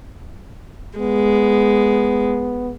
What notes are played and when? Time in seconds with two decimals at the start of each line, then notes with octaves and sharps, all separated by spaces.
0.99 G#3 B3